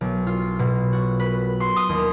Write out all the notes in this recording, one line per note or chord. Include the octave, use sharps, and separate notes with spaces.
B1
F4
B2
F#4
B4
C6
D#6
D#2